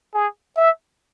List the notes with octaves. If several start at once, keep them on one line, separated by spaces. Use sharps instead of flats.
G#4
E5